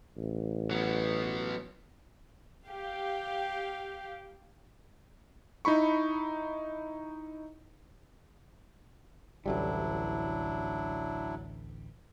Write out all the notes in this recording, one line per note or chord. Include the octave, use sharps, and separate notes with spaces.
A1
F#3 B3
G4 F5
D#4 E4 B5 C#6
A1 D2 F#3 G3 D4 E4